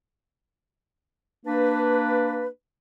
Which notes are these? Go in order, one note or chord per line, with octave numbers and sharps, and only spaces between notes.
A#3 D4 B4